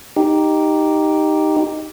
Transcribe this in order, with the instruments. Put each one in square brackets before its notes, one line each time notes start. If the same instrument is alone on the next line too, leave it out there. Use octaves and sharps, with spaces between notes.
[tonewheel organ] D#4 G4